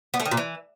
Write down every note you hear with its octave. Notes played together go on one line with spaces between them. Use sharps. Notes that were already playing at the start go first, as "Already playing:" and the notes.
B3
A3
D#3
A#2
E3